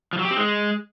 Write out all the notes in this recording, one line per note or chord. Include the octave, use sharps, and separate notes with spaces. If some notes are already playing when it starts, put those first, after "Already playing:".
F3
F#3
G4
C4
G#3